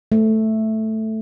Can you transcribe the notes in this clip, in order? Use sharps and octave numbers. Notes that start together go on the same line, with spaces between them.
A3